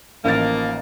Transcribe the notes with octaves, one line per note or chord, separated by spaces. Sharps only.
A1 D#3 F3 A#3 A6